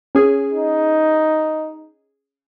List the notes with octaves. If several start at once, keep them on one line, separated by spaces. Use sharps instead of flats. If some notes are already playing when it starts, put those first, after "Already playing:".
C#4 G#4
D#4